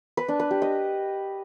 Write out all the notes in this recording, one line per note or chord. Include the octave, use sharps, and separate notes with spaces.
B4
D4
B4
G4
D#5